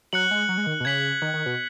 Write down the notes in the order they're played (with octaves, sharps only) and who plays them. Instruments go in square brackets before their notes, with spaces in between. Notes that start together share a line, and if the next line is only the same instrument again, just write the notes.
[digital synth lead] F#3 [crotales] F#6 C#7 F#7
[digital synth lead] G#3
F#3
G#3
D#3
B2
[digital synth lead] C#3 [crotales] G#6 B6 F#7
[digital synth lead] D#3
D#3
B2